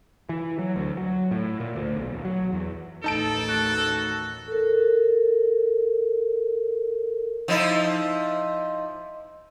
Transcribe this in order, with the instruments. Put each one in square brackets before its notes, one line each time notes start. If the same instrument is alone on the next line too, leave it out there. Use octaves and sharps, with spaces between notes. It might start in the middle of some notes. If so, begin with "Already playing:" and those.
[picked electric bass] E3
F#3
D2
F#3
A2
A#2
D2
B1
D#1
F#3
E2
[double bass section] A1 D#2 [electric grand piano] D#4 A5 D7 [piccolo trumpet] A4
[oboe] F#4
[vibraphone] A4 A#4
[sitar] F3 D#4 E4